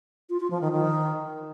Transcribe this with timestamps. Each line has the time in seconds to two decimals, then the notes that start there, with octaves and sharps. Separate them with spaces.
0.30 F4
0.40 F4
0.51 F3
0.61 D#3
0.72 D#3